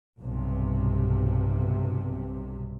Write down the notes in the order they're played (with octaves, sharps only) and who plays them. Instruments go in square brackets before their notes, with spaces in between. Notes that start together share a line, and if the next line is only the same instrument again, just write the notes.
[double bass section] B1 G2 C3